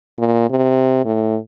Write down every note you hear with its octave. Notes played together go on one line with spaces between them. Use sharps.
A#2
C3
A2